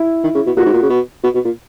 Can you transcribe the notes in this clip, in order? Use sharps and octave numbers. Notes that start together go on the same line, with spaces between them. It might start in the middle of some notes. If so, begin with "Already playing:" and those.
Already playing: E4
D#3
C#3
B2
A#2 F#4
G#2
A#2
C#3
B2
B2
B2
A#2